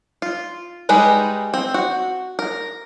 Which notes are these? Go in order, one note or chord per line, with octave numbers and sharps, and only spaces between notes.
F4
G3 G#3 D#4 B4
C4
F#4
A#4